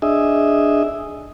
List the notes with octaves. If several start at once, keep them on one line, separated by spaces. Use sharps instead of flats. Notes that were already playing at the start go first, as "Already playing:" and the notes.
D4 G#4 D#5 E5